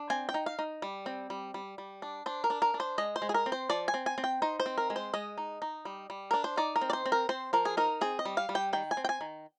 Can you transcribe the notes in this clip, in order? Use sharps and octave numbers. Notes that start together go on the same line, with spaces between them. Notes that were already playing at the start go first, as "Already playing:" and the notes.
Already playing: D4
C4 G#5
G5
D#4
F5
D#4
G3
C4
G3
G3
G3
D4
D4 C5
A#4
D4
A#4
D4
C5
G#3 D#5
C5
G#3
G#4
A#4
C4
C5
F3 D5
G#5
C4
G#5
C4
G5
D#4 C5
C5
C4
A#4
G#3
C5
G#3 D#5
D#4
D#4
G3
G3
D4 A#4
C5
D#4 D5
A#4
C4
D5
C5
C4
A#4
C4 C5
F3 A#4
G#4
D#4 A#4
C4 G#4
D#5
G3
F5
G3
G5
D#3 G5
G#5
C4
G5
G#5
D#3